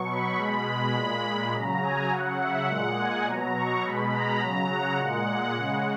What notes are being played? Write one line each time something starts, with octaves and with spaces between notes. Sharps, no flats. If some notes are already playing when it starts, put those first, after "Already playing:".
Already playing: B2 F#3 C#6
B5
B2 G#3 B5
A#2 G#3
C#3 F#3 A#5
G#5
C#3 F#3 F#5
E5
A#2 G#3 F#5
G#5
B2 F#3 A#5
C#6
B2 G#3 B5
A#5
C#3 F#3 A#5
F#5
A#2 G#3
C#3 G#3